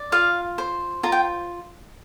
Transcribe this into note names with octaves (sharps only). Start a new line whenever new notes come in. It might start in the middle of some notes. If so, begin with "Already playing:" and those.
Already playing: D5
F4 F5
C5
F4 A#5
G5